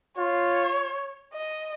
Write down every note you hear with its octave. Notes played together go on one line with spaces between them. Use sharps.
F4 C#5
D#5